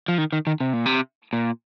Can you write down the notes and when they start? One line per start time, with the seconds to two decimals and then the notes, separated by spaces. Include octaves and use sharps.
0.08 F3
0.18 D#3
0.33 D#3
0.47 D#3
0.60 C3
0.73 A#2
0.86 C3
1.33 A#2